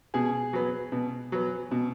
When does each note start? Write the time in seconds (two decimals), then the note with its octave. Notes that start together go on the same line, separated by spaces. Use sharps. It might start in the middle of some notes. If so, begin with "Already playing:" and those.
0.14 B2 G#4
0.53 F#3 B3
0.92 B2
1.32 F#3 B3
1.71 B2